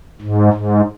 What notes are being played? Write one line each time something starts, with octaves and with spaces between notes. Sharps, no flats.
G#2
G#2